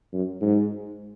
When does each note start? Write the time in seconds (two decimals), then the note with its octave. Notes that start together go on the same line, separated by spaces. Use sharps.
0.13 F#2
0.41 G#2